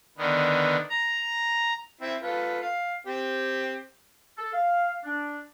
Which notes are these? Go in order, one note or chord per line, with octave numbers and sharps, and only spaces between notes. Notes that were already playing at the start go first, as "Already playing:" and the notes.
D3 D#3 B3
A#5
C4 E4 E5
F4 A4 B4
F5
C4 G4
A4
F5
D4